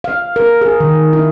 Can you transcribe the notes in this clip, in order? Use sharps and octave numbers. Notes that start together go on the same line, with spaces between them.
F5
A#4
G#4
D#3
E4